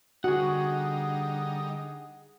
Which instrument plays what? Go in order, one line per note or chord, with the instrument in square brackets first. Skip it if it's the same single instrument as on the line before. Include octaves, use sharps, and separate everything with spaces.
[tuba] D3 [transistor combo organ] G3 D#4 [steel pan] F#4 [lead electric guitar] G#4 F#5